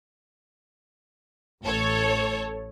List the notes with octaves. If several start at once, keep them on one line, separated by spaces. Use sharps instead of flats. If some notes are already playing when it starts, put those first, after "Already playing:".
A1 A4 C#5